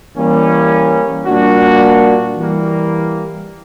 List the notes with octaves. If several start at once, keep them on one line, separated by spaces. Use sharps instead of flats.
E3 G3 A#3 C#4
A#2 G3 A#3 D4 F#4
E3 G3 A#3